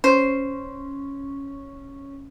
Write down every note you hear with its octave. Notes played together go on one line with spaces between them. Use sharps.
C#4 C5